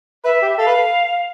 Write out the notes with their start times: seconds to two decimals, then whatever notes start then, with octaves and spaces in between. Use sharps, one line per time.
0.24 B4 E5
0.43 G4
0.59 A4 F5
0.67 B4